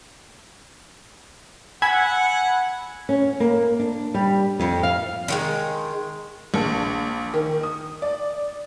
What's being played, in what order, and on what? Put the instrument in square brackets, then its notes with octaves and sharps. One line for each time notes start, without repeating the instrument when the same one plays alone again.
[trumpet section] F#5 [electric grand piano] G#5 [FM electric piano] B5 E6 G#6
[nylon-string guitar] C#4
A#3
D4
G3
F2
F5
[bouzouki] D3 D#3 G#3
[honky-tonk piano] A#1
D#3
D#6
D5